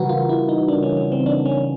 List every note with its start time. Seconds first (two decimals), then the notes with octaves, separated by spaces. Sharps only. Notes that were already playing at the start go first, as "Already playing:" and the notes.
Already playing: C#3 E3 G3 F#4 A#4 B4
0.09 F4
0.29 E4
0.49 D#4
0.68 D4
0.83 C#4
0.97 C#4
1.12 C4
1.26 D4
1.46 C#4